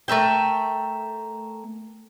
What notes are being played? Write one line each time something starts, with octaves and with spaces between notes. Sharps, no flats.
A3 A#4 E5 G5